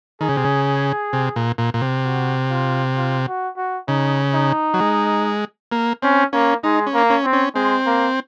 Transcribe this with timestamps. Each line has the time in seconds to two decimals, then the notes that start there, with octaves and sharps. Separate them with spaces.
0.21 D#3 G#4
0.29 C#3
0.36 C3
0.44 C#3
1.13 C3
1.36 A#2
1.58 A#2
1.74 A#2
1.82 C3
2.05 F#4
2.50 F4
2.97 F4
3.28 F#4
3.57 F#4
3.88 C#3 D#4
4.34 D#4
4.74 F#3
4.80 G#3
5.72 A#3
6.03 C4 C#4
6.33 A#3 C#4
6.63 G#3 D#4
6.87 C#4
6.94 A#3
7.10 C#4
7.24 C4
7.33 C#4
7.55 G#3 C4
7.86 A#3